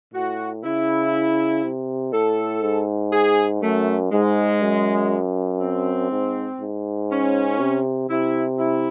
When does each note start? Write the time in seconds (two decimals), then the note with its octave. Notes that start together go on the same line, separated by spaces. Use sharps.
0.14 A2 F#4
0.64 C#3 E4
1.63 C3
2.12 A2 A4
2.62 G#2
3.12 G#4
3.61 F#2 A3
4.11 G#2 G#3
4.62 F#2
5.60 C4
6.11 G#2
6.60 G#2
7.10 C#4
7.60 C3
8.09 C3 E4
8.59 E4